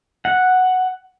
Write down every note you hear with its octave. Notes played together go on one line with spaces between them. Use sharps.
F#5